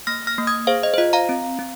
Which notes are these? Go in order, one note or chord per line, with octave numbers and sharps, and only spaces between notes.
A#3 F6 A#6
F6 A#6
A#3
D#6 G#6
G#4 C5 F5
D#5
C5
F4 D#5
F5 A#5
C4
C4